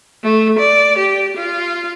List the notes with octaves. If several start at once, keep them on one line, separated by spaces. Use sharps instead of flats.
A3
D5
G4
F4